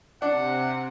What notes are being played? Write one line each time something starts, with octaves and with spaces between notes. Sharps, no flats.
C3 D4 F#5